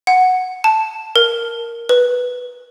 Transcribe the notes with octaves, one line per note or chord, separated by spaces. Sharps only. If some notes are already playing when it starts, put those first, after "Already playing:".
F#5
A5
A#4
B4